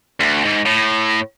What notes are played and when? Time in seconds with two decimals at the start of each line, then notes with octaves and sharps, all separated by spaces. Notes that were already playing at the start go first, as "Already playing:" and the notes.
0.20 D2
0.45 G#2
0.66 A2